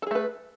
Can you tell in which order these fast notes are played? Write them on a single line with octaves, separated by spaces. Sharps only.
A4 G#4 A3 B4